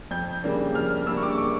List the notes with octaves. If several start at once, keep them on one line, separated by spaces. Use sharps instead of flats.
F2 G6
C#3 G3 A#3 D4
F2 F6
F6
C#3 G3 A#3 D4 E6
C#6
D6
C#6